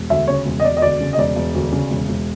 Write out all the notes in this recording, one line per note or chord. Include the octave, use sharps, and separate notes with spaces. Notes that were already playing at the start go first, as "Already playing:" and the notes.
Already playing: E1
D2 E5
C#3 C#5
E1
D#5
E1 D5
D#5
D2 D5
C#3
D#5
E1 D5
E1
D2
C#3
E1
E1